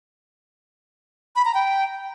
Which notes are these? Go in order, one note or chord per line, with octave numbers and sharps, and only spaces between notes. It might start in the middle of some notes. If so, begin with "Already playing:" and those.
B5
A#5
G5